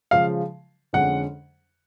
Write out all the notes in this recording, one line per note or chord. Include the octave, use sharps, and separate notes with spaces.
C#3 F3 G#3 F5
F2 D3 G#3 C#4 F#5